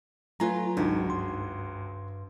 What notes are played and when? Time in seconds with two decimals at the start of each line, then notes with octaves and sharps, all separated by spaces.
0.40 F#3 A3 F4 B4 G#5 A#5
0.77 G#1 C#2 D4 D#4 F#4
1.10 G2 C6